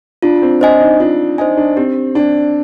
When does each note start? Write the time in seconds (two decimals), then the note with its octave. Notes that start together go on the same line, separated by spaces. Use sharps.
0.22 D4 F4
0.42 C4
0.61 D4 C5 D#5 G#5
0.80 D#4
1.00 D4 F4
1.38 D#4 C5 D#5 G#5
1.57 D4
1.76 C4 G4
2.15 D4 D5 G5